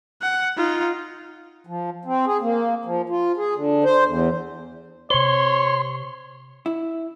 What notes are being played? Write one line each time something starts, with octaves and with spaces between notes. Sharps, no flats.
F#5
D#4 F4
F3
C4
G#4
A#3
F3
F4
G#4
D3
C5
E2
C3 C5 C#5 C6
E4